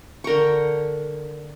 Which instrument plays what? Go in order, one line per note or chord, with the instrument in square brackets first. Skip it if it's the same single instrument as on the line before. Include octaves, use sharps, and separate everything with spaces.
[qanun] D3 A#4 G5 C#6